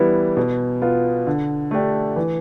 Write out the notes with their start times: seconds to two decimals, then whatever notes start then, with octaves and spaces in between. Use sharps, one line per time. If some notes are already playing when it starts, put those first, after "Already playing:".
Already playing: E3 G3 B3 E4
0.37 B2
0.82 B3 F4
1.27 D3
1.71 A3 D4 G4
2.16 E3